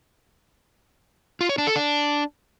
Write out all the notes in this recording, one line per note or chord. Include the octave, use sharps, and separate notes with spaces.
F4
C#5
D4
A4
D4